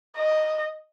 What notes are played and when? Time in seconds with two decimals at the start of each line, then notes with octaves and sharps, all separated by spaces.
0.17 D#5